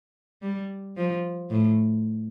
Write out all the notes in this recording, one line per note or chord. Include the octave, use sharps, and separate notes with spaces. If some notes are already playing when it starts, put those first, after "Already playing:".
G3
F3
A2